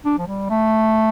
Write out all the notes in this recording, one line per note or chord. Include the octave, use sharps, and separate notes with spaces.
D4
F3
G3
A3